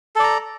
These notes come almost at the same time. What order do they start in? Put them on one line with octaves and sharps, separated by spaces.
A4 D5 A#5